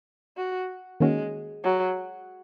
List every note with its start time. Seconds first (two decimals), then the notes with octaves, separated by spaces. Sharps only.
0.37 F#4
1.00 D#3 G#3 A#3 C#4 F#4
1.64 F#3